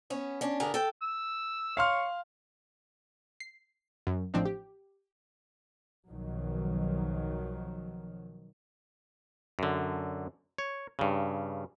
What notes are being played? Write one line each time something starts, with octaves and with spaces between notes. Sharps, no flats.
B3 C#4 C#5
C#4 D4
G2 D3 B3 G#4 A#4
A4 G5
E6
C#5 F5 C6 F6
C7
F#2
A1 F3 C4 D4 D#4
G4
B1 D#3 F3 F#3
F#2 D3
C#5
G2 C#3